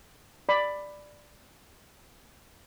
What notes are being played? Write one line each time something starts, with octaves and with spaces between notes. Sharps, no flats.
D5 B5